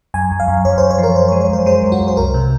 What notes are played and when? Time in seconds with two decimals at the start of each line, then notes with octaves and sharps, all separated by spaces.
0.14 F#2 G#5
0.32 F#2
0.40 F5
0.48 F#2
0.65 F#2 C#5
0.78 F#2 C5
0.90 C#5
0.98 F3
1.03 A#4
1.15 F#2 C5
1.28 C#5
1.32 G#3
1.41 C#5
1.49 F#2 C5
1.66 G#3 C5
1.83 F#2
1.92 F#4
2.01 F#2
2.08 C5
2.17 C2 A#4
2.34 C3